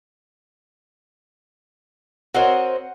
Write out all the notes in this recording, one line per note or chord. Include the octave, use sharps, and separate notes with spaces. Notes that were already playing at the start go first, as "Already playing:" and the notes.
C4 F#4 A#4 C5 C#5 D#5 F#5